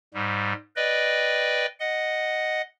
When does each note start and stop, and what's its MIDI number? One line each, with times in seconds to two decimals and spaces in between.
0.14 0.53 44
0.14 0.53 55
0.76 1.66 71
0.76 1.66 74
0.76 1.66 75
0.76 1.66 79
1.80 2.62 75
1.80 2.62 78